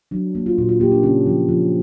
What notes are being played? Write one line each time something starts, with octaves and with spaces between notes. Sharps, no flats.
F#3 D4
A#3
F4
A#2 F#4
F4
A#3 G4
D4
C#3 C#4
F3
F3